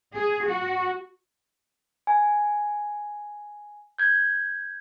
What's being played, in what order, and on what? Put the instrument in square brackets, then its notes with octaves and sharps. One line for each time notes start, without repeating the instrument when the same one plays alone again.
[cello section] G#4
F#4
[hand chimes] G#5
G6 G#6